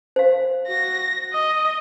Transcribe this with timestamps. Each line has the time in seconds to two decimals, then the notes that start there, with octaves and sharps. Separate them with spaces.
0.16 C5 F5
0.68 F#4 A#6
1.33 D#5 D#6